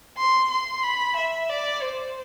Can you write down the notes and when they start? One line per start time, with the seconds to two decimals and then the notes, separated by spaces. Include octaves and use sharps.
0.17 C6
0.50 C6
0.83 B5
1.16 E5
1.50 D5
1.82 C5